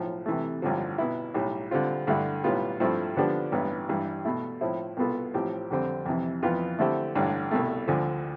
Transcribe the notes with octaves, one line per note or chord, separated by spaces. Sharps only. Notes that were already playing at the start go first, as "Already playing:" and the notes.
Already playing: B1 A2 F3
C3 E3 A3
A1 G2 D3 F3
B2 B3 E4
B1 A2 G3
D3 G3 C4 F4
G2 D3 A3 E4
B1 A2 G3 B3 F4
G2 F3 A3 C4 E4
D3 F3 B3 D4 G4
A1 G2 E3 B3
G2 E3 G3
B2 A3 E4
A2 F3 C4 E4
C2 B2 B3 F4 A4
A1 A2 F3 C4 G4
F2 D3 G3 C4
F2 C3 E3
F2 E3 B3 F4
D3 A3 C4 E4 G4
A1 G2 D3
C2 B2 A3
D2 D3 F3